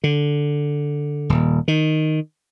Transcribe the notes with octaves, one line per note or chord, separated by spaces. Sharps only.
D3
D#1
D#3